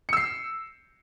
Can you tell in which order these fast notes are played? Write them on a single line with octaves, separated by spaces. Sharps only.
C#7 E6 C7